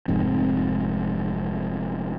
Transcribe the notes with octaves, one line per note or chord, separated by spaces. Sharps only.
F1 F2 G#2 C4